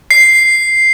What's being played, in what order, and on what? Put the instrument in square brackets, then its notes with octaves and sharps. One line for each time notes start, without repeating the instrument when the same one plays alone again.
[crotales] C7